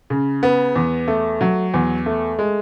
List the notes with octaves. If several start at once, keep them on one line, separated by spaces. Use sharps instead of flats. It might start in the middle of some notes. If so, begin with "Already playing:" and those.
C#3
B3
E2
A3
F#3
E2
A3
G#3